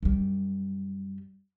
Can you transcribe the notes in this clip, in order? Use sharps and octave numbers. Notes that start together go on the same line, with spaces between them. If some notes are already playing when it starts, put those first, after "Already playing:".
F#2 G3